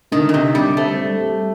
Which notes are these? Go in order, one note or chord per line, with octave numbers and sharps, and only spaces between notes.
D3 D#3
A#2
C3 D#4
D3 G3
A3 C4
G3
G4